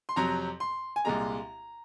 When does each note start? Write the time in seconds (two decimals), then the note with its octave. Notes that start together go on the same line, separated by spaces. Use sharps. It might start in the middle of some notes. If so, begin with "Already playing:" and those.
0.09 C6
0.16 F2 C3 F#3 A#5
0.60 C6
0.96 G#5
1.05 C2 A#2 G#3 A#5